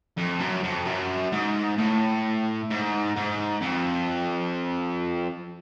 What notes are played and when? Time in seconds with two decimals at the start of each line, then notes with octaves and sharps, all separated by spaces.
0.18 F2
0.40 F#2
0.63 F2
0.86 F#2
1.32 G#2
1.78 A2
2.71 G#2
3.16 G#2
3.61 F2